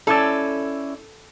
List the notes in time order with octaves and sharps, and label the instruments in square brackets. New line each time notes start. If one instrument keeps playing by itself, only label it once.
[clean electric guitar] C#4 E4 D5 [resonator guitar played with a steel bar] A4